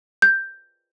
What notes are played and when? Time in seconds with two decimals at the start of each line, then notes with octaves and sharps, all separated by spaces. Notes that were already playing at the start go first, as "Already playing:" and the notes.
0.22 G6